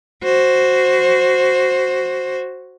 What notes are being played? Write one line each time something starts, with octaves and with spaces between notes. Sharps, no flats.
F#4 C5